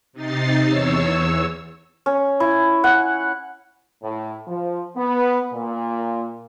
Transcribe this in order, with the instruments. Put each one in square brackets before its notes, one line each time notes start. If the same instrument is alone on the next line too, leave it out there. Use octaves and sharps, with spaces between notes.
[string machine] C3 D#4 A6 C7
E2 C#5 E6
[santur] C#4
E4
F#5
[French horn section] A2
F3
B3
A#2